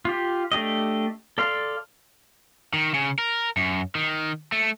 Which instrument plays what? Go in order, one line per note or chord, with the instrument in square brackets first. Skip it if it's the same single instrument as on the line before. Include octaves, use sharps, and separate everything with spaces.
[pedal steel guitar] F4 G4
A3 D4 G4 D#5
A4 D5 F5 C6
[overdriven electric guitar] D#3
C#3
A#4
F#2
D#3
A3